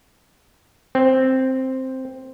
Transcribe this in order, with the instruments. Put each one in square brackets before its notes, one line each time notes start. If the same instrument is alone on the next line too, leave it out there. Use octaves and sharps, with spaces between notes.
[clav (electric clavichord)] C4